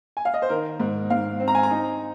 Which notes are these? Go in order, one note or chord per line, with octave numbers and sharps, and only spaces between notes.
G#5
F5
D#5
C5
D#3 A#4
G#2
G#2 F5
C4
A#5
G#5
A#5
D#4